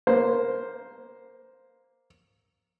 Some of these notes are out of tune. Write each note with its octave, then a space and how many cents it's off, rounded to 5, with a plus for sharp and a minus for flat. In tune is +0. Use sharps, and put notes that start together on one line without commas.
A#3 +10 C5 +0